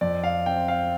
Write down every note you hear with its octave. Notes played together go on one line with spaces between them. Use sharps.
F2 D5
F5
C4 G5
F5